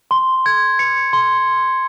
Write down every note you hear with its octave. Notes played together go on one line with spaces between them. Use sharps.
C6
G#6
C#7
C6